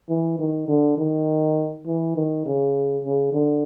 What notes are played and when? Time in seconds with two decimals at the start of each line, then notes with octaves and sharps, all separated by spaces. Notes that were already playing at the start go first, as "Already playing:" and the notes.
0.09 E3
0.39 D#3
0.68 D3
0.97 D#3
1.86 E3
2.16 D#3
2.45 C#3
3.04 C#3
3.33 D3